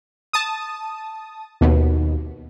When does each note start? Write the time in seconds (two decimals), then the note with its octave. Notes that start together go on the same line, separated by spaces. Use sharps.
0.33 A5 D#6
1.61 D#2 B2